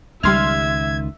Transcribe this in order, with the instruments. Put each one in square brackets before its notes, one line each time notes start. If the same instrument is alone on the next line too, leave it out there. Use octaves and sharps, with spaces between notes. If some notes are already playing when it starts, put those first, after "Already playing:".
[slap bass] C#2 D#3 [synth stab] G3 C6 F6 [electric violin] E5 [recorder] G#6